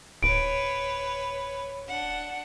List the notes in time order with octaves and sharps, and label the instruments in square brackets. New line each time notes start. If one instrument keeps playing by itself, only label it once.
[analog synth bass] D1 [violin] B4 C#5 [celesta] D7
[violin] D4 F#5